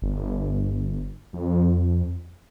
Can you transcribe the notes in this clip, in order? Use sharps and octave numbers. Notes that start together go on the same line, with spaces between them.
G1
F2